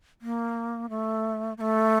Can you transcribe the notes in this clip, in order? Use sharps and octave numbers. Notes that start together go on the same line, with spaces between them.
A#3
A3
A#3
A3